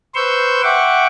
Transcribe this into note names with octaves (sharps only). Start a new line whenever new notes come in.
B4 C5 C6 C#6 E6 G6
E5 F#5 G5 C#6 D6